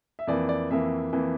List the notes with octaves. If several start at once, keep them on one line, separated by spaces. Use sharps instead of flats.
E5
F2 E3 A#3 D5
D5
F2 E3 A#3 E5
F2 E3 A#3